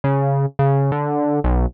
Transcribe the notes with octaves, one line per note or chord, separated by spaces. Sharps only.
C#3
C#3
D3
B1